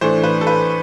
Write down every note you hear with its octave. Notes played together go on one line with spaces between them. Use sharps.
A2 E3 A3 D4 C5
B4
A4
B4